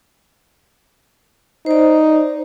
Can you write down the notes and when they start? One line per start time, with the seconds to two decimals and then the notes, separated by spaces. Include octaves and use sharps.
1.66 D#4 C5 D5